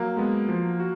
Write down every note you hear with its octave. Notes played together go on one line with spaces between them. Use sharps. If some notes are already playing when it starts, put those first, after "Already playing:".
Already playing: F#3 A#3
G#3 B3
F3
F#4